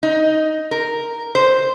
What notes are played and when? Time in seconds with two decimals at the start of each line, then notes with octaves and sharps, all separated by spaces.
0.03 D#4
0.71 A#4
1.35 C5